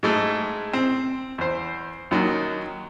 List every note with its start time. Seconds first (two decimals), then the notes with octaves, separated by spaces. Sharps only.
0.03 G#2 G#3 A3
0.74 C4
1.38 E2 C5
2.11 D#2 D#3 F#3